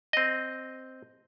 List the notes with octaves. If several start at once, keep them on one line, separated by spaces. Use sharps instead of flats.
C4 D#5